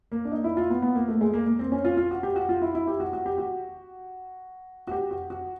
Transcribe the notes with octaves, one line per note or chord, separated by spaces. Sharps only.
A#3
D4
D#4
E4
F4
B3
B3
A#3
A3
G#3
A#3
A#3
C4
C#4
F4
F4
F#4
G4
F#4
F4
E4
E4
G4
F#4
F#4
G4
F#4
F#4
G4
F#4
F#4